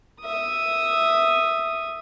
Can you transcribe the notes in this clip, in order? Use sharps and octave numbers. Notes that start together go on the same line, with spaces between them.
E5 D#6